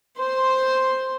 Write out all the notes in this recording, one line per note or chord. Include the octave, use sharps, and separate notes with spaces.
C5 C6